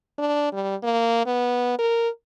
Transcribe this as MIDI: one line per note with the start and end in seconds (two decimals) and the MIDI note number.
0.18 0.49 62
0.53 0.75 55
0.83 1.22 58
1.26 1.78 59
1.79 2.09 70